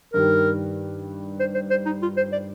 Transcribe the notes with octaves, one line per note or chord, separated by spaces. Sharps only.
G2 D#3 G3 A#4
C5
C5
C5
D#4
F4
C5
D5